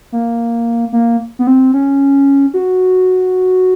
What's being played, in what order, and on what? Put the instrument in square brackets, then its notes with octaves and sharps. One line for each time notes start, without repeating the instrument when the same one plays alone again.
[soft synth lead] A#3
A#3
B3
C4
C#4
F#4